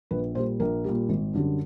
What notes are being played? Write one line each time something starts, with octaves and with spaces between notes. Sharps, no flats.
A#1 B4
A#2 G3 C5
A#1 A#4
A#2 G3
G#1
F#2 D3 G3